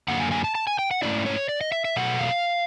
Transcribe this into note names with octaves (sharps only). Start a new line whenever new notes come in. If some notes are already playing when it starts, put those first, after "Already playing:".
F#2 D3 F#3 A#3 F#5
G#5
G#5
A5
A5
G#5
G5
F#5
G#2 E3 A3 C#4 E4 D5
C#5
D5
D#5
E5
E5
B2 F#3 A3 F#5
F5